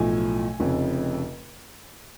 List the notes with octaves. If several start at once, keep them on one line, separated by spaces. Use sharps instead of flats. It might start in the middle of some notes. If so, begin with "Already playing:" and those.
Already playing: B1 A2 F3 A3 G#5
F1 F2 C#3